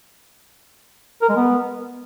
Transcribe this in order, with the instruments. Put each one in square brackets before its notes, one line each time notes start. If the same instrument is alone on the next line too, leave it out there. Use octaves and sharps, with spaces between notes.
[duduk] A#4
G#3
B3